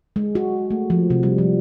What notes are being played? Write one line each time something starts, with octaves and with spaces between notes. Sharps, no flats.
G#3
F#4
A3
F3
C3
G3
F3